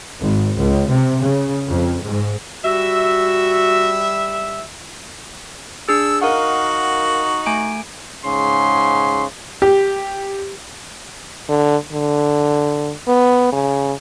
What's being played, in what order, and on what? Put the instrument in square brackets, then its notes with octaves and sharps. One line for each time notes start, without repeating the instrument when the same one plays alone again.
[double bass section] G#1
C#2
C3
C#3
F2
G#2
[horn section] G3 E5 [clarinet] F#4
[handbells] D4 G#4 [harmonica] E6
[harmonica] D#4 F#4 [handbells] A#4 F5 F#5
[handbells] A3 G#5 D7
[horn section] G#2 C#3 C6
[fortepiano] G4
[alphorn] D3
D3
B3
C#3